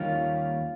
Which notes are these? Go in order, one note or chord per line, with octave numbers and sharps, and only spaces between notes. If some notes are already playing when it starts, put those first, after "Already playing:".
Already playing: D#2 D#3 G3 A#3 C#4 F4